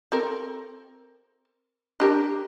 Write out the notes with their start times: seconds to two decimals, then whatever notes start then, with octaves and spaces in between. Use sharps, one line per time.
0.12 C4 A4 A#4
2.00 D4 G4 A#4